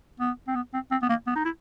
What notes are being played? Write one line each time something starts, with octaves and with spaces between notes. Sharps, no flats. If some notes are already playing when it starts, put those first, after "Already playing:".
B3
C4
B3
C4
C4
B3
A#3
B3
D#4
E4